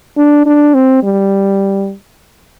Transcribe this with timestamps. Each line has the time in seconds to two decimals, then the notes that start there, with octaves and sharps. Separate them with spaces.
0.18 D4
0.46 D4
0.75 C4
1.03 G3